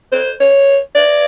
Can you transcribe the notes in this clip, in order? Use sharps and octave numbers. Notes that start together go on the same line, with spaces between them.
C5
C#5
D5